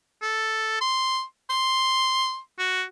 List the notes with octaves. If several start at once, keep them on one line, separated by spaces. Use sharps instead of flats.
A4
C6
C6
F#4